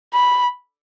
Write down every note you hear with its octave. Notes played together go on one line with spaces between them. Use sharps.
B5